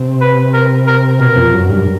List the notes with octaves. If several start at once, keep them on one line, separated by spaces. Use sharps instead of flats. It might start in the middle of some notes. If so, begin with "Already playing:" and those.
Already playing: C3
B4
A#4
A#4
B2 A#4
F2
F#2
G2